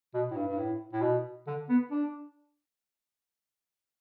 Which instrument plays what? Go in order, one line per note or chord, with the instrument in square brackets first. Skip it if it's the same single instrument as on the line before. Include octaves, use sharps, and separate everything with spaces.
[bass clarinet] B2
A2
G2
G2
A2
A2
B2
D3
B3
D4